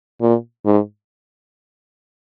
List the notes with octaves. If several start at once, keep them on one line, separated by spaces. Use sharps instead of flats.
A#2
G#2